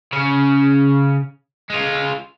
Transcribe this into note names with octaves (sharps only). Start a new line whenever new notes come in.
C#3 C#4
G#3 F4